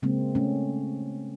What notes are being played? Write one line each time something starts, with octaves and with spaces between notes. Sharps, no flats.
C#3 G#3 A#3 C4
A3 C#4